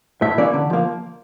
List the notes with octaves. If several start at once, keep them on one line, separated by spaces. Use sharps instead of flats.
A2 E5
E3 A#3 C#4 D5
D3
F3 A#3